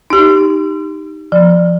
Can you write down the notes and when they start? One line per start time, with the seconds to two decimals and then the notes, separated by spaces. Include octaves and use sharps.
0.10 D#4 G4
1.32 F3